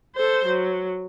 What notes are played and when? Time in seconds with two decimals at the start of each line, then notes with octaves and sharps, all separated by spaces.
0.16 A4 C5
0.46 F#3